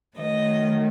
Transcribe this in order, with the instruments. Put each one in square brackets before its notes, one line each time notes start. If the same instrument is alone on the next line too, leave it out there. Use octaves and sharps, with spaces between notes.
[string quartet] D#3 F#3 A3 D#5